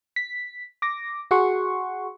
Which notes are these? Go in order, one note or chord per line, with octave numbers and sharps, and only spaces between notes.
B6
D6 A#6
F#4 G#4 F#5 C6 C#6